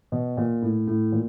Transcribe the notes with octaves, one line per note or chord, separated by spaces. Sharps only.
B2
A#2
A2
A2
A#2